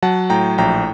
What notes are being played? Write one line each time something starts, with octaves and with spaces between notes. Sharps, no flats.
F#3 F#5 A5
A2 G5 A#5
A#1 G5 A#5